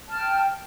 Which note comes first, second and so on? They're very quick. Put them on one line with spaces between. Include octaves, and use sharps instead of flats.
A5 F6 G5